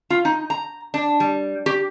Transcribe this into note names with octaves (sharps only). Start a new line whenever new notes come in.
F4
D#4
A#5
D4
G3
G4